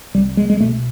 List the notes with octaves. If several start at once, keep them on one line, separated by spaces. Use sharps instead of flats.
C2 G3
G#3
G#3
B2 A3